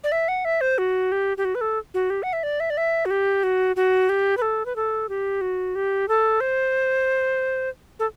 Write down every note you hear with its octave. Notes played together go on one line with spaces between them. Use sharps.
D5
E5
F#5
E5
C5
F#4
G4
G4
F#4
B4
A4
F#4
G4
F#5
E5
D5
E5
D5
E5
F#4
G4
F#4
F#4
G4
B4
A4
B4
A4
G4
F#4
G4
A4
C5
A4